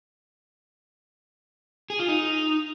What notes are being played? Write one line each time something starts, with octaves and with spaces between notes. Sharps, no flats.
G#4
F4
D#4